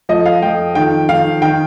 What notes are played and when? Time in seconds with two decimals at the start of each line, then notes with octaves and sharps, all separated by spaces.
0.09 F2 F3 D#5
0.26 F5
0.42 F2 F3 G5
0.75 F2 D#3 G5
1.09 F2 D#3 F5
1.42 D#3 G5